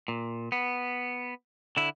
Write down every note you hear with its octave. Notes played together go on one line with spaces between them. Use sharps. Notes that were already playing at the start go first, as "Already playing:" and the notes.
A#2
B3
D3 E4